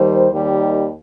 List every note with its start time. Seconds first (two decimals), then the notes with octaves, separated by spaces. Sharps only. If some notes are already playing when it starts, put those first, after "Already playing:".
Already playing: D#2 D#3 G3 C5
0.31 D#2 D#3 G3